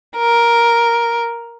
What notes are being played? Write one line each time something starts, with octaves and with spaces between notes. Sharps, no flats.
A#4